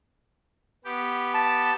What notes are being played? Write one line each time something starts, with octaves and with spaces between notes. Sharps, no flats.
B3 G4
A5